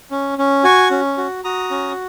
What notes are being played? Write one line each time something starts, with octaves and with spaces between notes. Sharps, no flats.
C#4
C#4
F#4 G#5 C#6
C#4
F#4
F#4 A#5 D#6
C#4